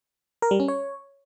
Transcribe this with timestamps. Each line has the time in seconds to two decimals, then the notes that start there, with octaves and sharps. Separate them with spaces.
0.42 A#4
0.51 G3
0.60 C#4
0.68 C#5